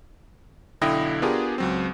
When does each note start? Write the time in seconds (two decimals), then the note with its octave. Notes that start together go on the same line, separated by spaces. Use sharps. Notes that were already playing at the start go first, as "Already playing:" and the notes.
0.81 B1 D3 E4 G5 D#6 A#6
1.22 B3 D4 F4 G4 G#4 A#4
1.58 C#2 F#3 C4